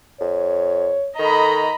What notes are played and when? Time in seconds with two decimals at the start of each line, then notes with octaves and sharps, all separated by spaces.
0.21 F2 C#5
1.19 D#3 A4 D#5 A#5 B5